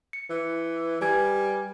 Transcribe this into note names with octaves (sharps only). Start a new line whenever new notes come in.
C#7
E3
G3 B4 G#5 G#6